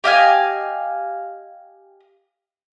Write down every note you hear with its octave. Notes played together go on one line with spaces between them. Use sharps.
G4 D#5 F5 G#5